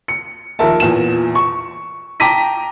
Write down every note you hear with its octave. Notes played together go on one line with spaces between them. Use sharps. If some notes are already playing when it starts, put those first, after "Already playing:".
C#7
D#2 F3 A#4 E5 A5
E2 A#2 E7
C#6
G5 A5 A#5 D6 B6 D#7